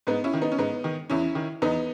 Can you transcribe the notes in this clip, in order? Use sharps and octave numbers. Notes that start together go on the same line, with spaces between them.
G#2 B3 D#4
C#4 E4
D#3
B3 D#4
C#4
G#2 B3 D#4
D#3
E2 C#4 E4
D#3
E2 B3 D#4